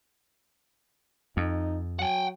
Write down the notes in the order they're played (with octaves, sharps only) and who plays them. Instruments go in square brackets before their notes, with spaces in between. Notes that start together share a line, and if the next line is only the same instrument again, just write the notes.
[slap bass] F2 [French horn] D#4
[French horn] F#3 [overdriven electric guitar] F#5 G5